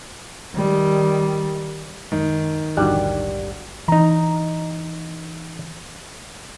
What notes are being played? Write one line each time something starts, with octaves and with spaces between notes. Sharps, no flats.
D#3 G3
F#2 D#3 F#3 G#3
A#1 E2 G#2 D3 F#3 G3 F#6
E3 D#4 A#5